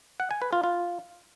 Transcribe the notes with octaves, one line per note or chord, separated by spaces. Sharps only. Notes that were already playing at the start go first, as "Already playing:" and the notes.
F#5
G#5
B4
F4
F4